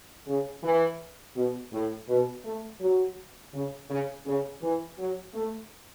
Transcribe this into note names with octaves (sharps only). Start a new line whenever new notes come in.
C#3
E3
B2
A2
B2
A3
F#3
C#3
C#3
C#3
E3
F#3
A3